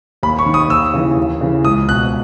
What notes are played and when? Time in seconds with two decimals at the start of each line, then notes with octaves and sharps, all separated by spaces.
0.23 D#2 B5
0.39 C#6
0.46 D#3
0.54 D#6
0.69 D#2 E6
0.94 C#3 E3
1.17 D#2
1.41 C#3 E3
1.64 C#2 D#6
1.88 B2 F#6